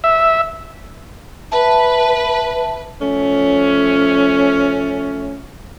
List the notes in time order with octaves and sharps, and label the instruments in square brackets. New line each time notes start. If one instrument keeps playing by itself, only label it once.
[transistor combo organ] E5
[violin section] B4 [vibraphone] E5 A5
[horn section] F3 A3 C#4